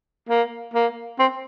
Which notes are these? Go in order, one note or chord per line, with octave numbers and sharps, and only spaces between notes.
A#3
A#3
C4